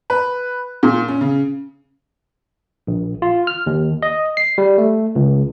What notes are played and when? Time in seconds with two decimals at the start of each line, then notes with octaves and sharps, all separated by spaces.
0.10 B4
0.83 A#2
1.08 C#4
1.21 C#3
2.87 A#1
3.22 F4
3.47 F6
3.66 D#2
4.03 D#5
4.37 C7
4.58 G3
4.78 A3
5.15 C#2